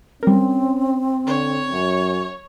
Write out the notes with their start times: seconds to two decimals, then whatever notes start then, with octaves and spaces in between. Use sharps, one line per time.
0.23 G3 C4 C#4 A#4
1.27 D3 C#5
1.73 F#2